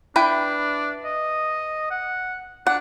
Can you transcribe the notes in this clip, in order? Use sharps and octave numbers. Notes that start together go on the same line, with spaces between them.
D4 E4 B4 G5
D#5
F#5
D4 F#5